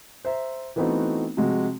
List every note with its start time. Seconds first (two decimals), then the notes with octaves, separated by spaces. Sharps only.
0.25 C5 E5 A#5
0.76 E3 A3 B3 C4 D#4 F#4
1.37 C3 F3 G#3 F#4